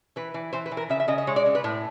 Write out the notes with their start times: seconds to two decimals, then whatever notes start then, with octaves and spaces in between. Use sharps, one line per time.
0.16 E3 B4
0.34 E3
0.53 E3 C5
0.66 B4
0.72 E3
0.77 A#4
0.89 C#3 E5
1.00 E5
1.08 C#3 D#5
1.18 D#5
1.27 G#3 C#5
1.36 D5
1.46 C#3
1.55 B4
1.64 A2